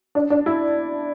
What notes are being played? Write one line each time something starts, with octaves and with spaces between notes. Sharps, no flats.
D4
D4
E4